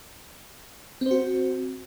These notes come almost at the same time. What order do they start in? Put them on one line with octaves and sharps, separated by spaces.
C4 C5 F#4